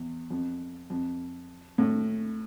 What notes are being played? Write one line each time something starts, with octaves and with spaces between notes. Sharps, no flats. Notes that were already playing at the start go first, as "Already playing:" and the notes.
Already playing: E2
F2
F2
A2